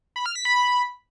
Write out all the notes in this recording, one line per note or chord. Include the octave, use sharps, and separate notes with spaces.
B5
F6
B6
B5